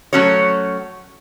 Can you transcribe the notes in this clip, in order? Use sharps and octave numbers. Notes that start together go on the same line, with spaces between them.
F#3 A3 C#4 F#4 C#5